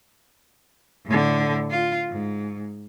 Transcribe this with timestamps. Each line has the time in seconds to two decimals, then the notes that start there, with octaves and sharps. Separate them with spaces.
1.06 A2 D3
1.70 F4
2.10 G#2